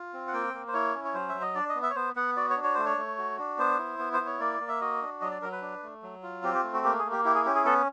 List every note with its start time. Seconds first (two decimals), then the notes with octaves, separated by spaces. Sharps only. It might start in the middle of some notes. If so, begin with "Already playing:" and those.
Already playing: F4
0.13 C4
0.28 F#5
0.33 A#3 G5
0.54 A#3
0.68 C5
0.73 E4 C#5
0.95 C#4
1.04 C#5
1.14 F#3 C5
1.29 E5
1.34 F#3
1.41 D#5
1.55 D4 D5
1.69 D#5
1.75 B3
1.82 E5
1.90 C#5
1.95 B3 C5
2.16 B3 F#5
2.36 F#4 D5
2.50 C#5
2.57 D4
2.63 C#5
2.74 A3 C5
2.85 C#5
2.97 A3
3.18 F#4
3.38 D4
3.58 B3 C5
3.78 E4
3.99 B3
4.13 C5
4.20 E4
4.26 C#5
4.40 A#3 D5
4.60 A#3
4.69 E5
4.81 F#4 D#5
5.02 D4
5.21 F#3 D#5
5.31 D5
5.42 F#3 A#4
5.52 B4
5.62 D4
5.83 A3
6.03 F#3
6.23 F4
6.43 C4 G4
6.54 G4
6.63 A3
6.74 F#4
6.84 A#3 G4
6.98 G#4
7.05 A#3
7.11 G4
7.25 E4 G4
7.35 G#4
7.45 C#4 G4
7.55 G#4
7.65 B3 A4